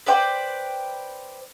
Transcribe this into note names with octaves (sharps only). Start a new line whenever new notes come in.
B4 C5 D5 G5